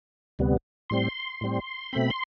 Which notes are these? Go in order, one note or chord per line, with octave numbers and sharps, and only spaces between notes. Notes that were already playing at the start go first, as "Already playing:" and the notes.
D2 C3 G3 B3
A2 G3 C4 C6
A2 G3 C4
B2 A3 C4 B5
C6